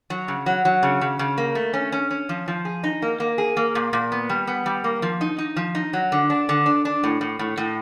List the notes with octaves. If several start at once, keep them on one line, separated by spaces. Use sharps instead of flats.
F#3
C#3
F#3
F#3
C#3
C#3
C#3
A#3
A3
C#4
C#4
C#4
F3
F3
G#4
D#4
A#3
A#3
G#4
A#3
A#2
A#2
B3
G3
B3
G3
A#3
F3
D#4
D#4
F3
D#4
F#3
D3
D4
D3
D4
D4
A2
A2
A2
A2